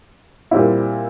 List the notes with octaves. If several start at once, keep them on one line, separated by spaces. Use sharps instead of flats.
A#2 G3 C4 E4